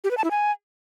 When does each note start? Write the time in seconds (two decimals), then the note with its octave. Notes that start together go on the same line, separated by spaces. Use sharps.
0.04 G4
0.11 B4
0.17 A5
0.24 E4
0.31 G#5